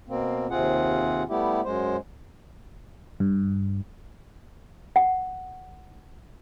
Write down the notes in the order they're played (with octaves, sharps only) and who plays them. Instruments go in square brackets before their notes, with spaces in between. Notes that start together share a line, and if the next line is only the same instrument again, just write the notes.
[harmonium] B2 A#3 C4
D#2 C3 C4 F4 G#4 F#5
G3 A3 B3 E4 G4
F#2 G#3 C5
[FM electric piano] G2
[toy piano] F#5